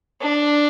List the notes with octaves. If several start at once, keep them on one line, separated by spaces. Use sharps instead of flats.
D4